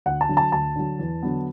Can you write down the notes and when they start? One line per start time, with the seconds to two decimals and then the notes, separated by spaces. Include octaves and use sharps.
0.06 D2 F#5
0.21 A5
0.29 D3 F#3
0.37 A5
0.52 D2 A5
0.76 D3 F#3
0.99 E2
1.23 D3 F#3 B3